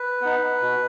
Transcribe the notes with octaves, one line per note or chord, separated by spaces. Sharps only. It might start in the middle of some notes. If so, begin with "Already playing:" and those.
Already playing: B4
B3 D#4
B2